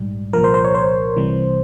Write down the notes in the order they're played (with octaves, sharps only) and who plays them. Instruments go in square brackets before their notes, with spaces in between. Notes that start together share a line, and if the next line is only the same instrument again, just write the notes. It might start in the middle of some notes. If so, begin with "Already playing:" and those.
Already playing: [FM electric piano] A#1 G#2 G3
C2 A#2 F3 A#4
C5
C5
C#5
C5
C2 C3 E3 G3